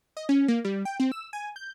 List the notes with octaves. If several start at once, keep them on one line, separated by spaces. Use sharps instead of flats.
D#5
C#4
A#3
G3
G5
C4
E6
G#5
G6